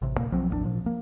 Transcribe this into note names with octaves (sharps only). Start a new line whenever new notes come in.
A1 C3
D1 F2 A#2 A#3
B1 F3 F#3 C4
A1 D#2 A#3 D4
A#2 F3
A#3